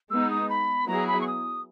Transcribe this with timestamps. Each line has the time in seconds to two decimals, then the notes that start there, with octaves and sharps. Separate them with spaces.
0.10 G#3 B3 D#4 E6
0.30 D#6
0.49 B5
0.88 F#3 B3 E4 G#4 A#5
1.07 B5
1.21 C#6
1.27 D#6